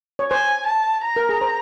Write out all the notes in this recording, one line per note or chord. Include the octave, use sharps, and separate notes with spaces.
C#5
C5 G#5
A5
A#5
A#4
G#4
C5